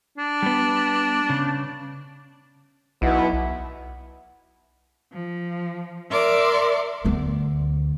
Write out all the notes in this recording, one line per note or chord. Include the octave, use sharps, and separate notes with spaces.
D4
G3 B3
C#3
B1 B2 B3 E4
F3
A#4 D5 E5 C6 D6
D2 B3